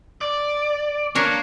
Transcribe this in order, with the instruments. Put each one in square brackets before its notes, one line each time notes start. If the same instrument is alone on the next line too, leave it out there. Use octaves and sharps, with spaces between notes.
[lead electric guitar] D5
[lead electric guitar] A#3 [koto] D4 A#4 C#5